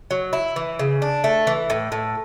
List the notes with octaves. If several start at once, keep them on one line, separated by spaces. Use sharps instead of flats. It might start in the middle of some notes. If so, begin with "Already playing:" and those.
F#3
E4
E3
C#3
D4
A3
E3
A2
A2